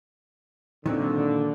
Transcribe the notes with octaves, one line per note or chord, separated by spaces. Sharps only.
A#2 D3 D#3 F#3 C4